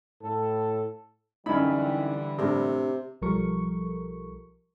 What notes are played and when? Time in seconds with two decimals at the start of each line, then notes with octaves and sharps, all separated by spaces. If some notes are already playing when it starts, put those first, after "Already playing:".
0.21 A2 A4
1.46 F#2 D3 E3 G3 D#4 E4 B5
2.38 A2 C3 D4 A#4
3.22 B1 F3 G3 A4 A#4 C#6